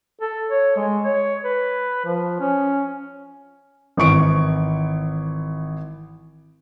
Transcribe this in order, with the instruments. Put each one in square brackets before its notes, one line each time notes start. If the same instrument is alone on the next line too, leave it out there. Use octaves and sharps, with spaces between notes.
[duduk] A4
C#5
G#3
C#5
B4
F3
C#4
[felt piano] G#1 E3 C#6 D7